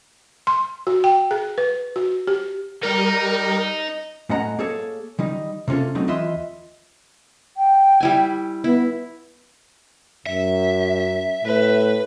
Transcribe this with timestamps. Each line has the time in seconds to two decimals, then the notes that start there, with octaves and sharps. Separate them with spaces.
0.47 C6
0.87 F#4
1.04 G5
1.31 G#4
1.58 B4
1.96 F#4
2.27 G4
2.83 G3 D#4 A#4
4.30 A2 C#4 D#5 F#5 A#5
4.59 A#3 G#4 A4 C#5
5.19 D#3 G3 D#4
5.68 C3 A#3 C#4 F4 A4
5.95 F#3 A3 C4 D#4
6.08 D#2 E3 F4 D#5 E5 C6
7.57 G5
8.00 G3 E4 G#5
8.64 B3 E4
10.26 F#2 E5
11.44 A2 B4